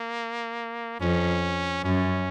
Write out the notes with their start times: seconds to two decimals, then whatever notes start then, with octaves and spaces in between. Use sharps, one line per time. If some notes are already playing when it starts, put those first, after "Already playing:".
Already playing: A#3
1.00 F2 C#4
1.84 F#2 C#4